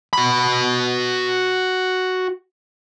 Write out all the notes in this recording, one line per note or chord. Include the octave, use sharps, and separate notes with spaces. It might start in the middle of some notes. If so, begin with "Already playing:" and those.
F#4 B5